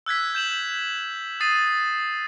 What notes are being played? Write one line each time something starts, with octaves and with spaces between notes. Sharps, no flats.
E6 F#6 G#6 B6
G6 E7 F#7
D#6 A6 C7 D#7